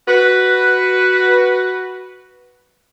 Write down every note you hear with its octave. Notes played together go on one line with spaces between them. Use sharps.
F#4 B4